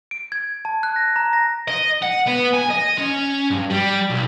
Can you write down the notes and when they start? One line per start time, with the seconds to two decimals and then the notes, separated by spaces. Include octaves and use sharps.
0.11 D7
0.32 G#6
0.65 A5
0.83 F#6
0.96 A#6
1.16 A#5
1.33 A#6
1.68 D#5
2.02 F#5
2.26 B3
2.53 G#5
2.69 D#5
2.98 C#4
3.51 G2
3.70 G3
4.10 B1